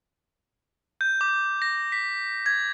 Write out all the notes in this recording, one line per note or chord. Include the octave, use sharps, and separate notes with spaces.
G6
D6
A#6
B6
G#6